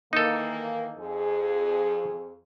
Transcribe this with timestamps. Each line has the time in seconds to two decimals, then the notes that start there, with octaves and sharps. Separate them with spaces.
0.13 D#3 E3 A#3 D#4 A4
0.98 F2 G#4